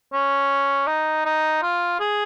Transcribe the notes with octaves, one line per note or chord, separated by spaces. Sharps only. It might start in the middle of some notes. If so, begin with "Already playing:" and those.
C#4
D#4
D#4
F4
G#4